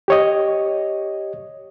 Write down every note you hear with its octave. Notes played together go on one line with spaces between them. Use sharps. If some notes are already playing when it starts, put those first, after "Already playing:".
G4 C#5 D#5